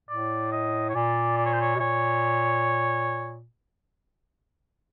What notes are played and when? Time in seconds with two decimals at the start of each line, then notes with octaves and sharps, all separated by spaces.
0.09 A2 D5
0.52 D#5
0.89 C#5
0.95 A#2 D5
1.37 D5
1.46 C#5
1.53 C5
1.61 C#5
1.76 B2
1.80 A#2 C#5